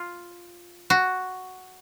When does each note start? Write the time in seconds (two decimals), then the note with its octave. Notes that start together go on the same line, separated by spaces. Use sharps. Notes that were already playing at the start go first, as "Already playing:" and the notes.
Already playing: F4
0.90 F#4